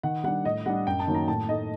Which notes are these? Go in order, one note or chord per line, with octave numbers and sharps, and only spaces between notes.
D#3 F#5
G3 D4 F#5
A2 D#5
G3 D4 F#5
F#2 G5
A5
D#3 F#3 A#3 D#4
A#5
A2 A5
A3 D#4 D#5